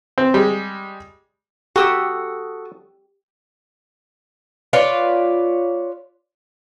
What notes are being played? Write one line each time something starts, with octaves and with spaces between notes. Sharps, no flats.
C4
G3 G#3
F#4 G4 A4 D#6 E6
F4 B4 C#5 D5